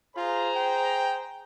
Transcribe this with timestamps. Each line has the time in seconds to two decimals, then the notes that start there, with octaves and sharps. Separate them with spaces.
0.16 F4 G#4 C5 A#5
0.56 G5